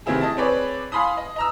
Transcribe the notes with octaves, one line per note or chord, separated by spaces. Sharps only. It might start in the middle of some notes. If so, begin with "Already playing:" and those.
C3 D#3 C4 E4 G#4
D#5 A5
C4 G#4 B4 C#5 D5
F5 G#5 B5 C6 D#6
D#5
D#5 A#5 E6